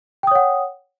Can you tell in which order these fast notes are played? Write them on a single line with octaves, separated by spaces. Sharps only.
G5 D#6 C#5 F#5